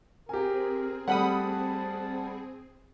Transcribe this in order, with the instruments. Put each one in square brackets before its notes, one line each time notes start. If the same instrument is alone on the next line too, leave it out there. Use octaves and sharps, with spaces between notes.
[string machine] C4 G#4 [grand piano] G4 G#5 [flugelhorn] A#4
[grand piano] G3 A3 [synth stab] F#5 B5 D#6 [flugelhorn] A5